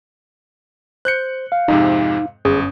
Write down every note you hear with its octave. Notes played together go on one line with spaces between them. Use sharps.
C5 F#6 G6 C#7
F5
F2 G#2 C3 D#4
G1 F#2 C#4 G#4 D#6